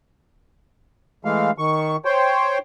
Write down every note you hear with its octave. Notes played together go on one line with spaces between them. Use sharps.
E3 G#3 A3 F5
D#3 C#6
C5 C#5 G5